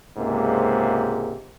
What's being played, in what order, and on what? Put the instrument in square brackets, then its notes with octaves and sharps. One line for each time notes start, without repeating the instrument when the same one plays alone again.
[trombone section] C#2 G#2 C3 A#3